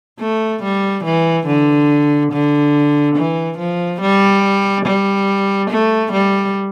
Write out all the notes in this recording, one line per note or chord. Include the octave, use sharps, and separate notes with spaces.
A3
G3
E3
D3
D3
E3
F3
G3
G3
A3
G3